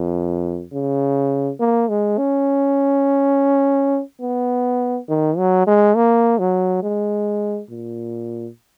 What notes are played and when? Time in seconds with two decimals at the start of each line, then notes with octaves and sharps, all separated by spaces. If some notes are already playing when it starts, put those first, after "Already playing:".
Already playing: F2
0.73 C#3
1.60 A#3
1.89 G#3
2.18 C#4
4.21 B3
5.09 D#3
5.37 F#3
5.67 G#3
5.96 A#3
6.39 F#3
6.82 G#3
7.70 A#2